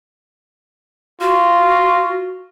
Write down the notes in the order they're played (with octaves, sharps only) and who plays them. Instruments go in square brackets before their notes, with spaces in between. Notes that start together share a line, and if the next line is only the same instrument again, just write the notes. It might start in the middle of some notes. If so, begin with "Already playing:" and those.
[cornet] F4 [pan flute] F#4